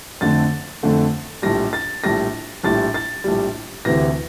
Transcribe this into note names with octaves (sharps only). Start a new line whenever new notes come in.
F2 D3 A3 A6
F2 D3 A3
A#1 A2 G3 A#6
A6
A#1 A2 G3 A#6
A#1 A2 G3 A6
A6
A#1 A2 G3
D2 C3 E3 A#6